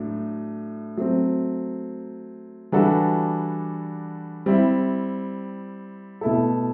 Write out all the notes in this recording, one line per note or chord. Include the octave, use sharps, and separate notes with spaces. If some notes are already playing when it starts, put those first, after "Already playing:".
Already playing: A2 F#3 A3 D4
F#3 A3 C4
E3 G3 D4 F#4 A4
G3 C4 E4
B2 A3 E4 A4